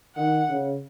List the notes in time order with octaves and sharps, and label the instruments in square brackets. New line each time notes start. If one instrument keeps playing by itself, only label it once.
[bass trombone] D#3 [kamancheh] F#5
[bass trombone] C#3